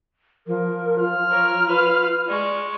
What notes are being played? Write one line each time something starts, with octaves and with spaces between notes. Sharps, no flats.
F3 A#4
F4 F6
A#4 C#5
B4 F5
G#3 D5 C#6